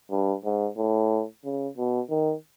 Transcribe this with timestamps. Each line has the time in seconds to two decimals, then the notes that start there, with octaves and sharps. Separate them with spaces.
0.11 G2
0.45 G#2
0.77 A2
1.45 C#3
1.77 B2
2.10 D#3